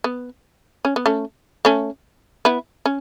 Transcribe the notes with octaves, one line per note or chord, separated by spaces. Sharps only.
B3
C#4
B3
A3 C#4
A3 C#4
B3 E4
C#4